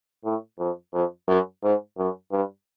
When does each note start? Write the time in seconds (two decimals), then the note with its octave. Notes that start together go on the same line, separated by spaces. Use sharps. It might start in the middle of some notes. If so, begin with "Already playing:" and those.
0.25 A2
0.59 F2
0.93 F2
1.28 F#2
1.63 G#2
1.98 F#2
2.32 G2